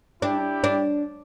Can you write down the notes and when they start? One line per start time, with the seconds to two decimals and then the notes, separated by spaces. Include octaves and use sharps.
0.22 D4 E4 G4 D5 G5
0.64 D4